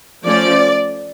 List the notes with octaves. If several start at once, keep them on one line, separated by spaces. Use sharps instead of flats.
F3 A3 C#4 D5